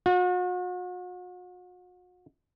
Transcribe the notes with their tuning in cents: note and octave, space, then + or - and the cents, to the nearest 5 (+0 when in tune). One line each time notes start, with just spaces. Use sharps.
F#4 -40